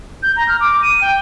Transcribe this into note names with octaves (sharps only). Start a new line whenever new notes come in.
G6
A#5
F6
D6
D#7
G5